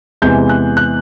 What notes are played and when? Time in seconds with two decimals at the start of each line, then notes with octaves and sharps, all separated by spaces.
0.22 E2 C3 E3 G#3 G6
0.49 F#6
0.77 F#6